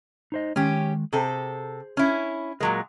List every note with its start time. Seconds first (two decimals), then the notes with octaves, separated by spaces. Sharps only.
0.32 D#4 C5 D#5
0.56 D#3 G#3 C#4 G4
1.13 C3 G#4 A4 C5
1.97 C#4 E4
2.60 A#2 F#3 G#3 A#4